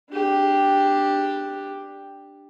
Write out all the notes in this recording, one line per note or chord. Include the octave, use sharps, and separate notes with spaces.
D4 G4